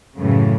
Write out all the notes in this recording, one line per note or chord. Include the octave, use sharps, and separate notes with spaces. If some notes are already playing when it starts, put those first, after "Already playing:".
F#2 A2 C#3 E3 A3